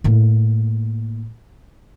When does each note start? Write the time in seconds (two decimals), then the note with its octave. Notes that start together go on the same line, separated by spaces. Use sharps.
0.04 A2 A#3